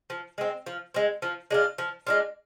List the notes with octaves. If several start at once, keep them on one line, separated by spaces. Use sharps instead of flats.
F3
G#3 C4
F3
G#3 C4
F3
G#3 D4 F4
F3
G#3 D4 F4